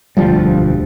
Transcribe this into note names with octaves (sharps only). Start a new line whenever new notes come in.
E1 D2 F3 G3